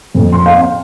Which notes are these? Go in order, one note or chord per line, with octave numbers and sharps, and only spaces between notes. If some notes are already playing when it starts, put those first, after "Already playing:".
F2
C6
F5
C4